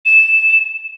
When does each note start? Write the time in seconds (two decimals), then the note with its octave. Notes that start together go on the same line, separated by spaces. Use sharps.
0.06 E7